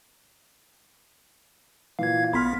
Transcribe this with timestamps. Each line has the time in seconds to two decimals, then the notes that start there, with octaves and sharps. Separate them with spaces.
1.99 A#2 E3 F5 G#6
2.33 A1 B3 B5 C6 F6 B6